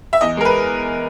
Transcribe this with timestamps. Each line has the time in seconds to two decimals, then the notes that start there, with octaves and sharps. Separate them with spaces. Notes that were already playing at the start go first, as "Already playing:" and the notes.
0.13 E5
0.21 E2 D#5
0.37 G#3 A#4
0.45 B4